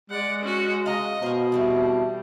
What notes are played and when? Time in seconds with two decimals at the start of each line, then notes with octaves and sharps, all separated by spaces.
0.10 G#3 D5 F#5
0.42 C#4 F#4
0.86 D#5 F5 A#5
1.22 B2 A#4 C5
1.52 E3 G3 A3 C4